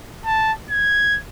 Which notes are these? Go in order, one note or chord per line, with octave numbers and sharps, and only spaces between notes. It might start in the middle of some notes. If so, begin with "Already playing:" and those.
A5
G#6